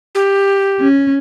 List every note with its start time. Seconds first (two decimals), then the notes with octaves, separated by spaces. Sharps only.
0.15 G4
0.80 C#4